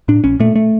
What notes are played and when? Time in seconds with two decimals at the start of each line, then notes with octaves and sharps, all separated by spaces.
0.08 A2 D4
0.24 A#1 C#4
0.40 A#2 A3
0.56 A3